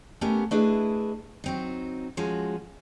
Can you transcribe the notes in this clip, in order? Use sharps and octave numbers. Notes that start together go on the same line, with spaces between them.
A3 B3 C#4 G4 A#4
A3 D4 E4 G#4 B4 D#5
F#3 C4 D#4
F3 G#3 C#4 F#4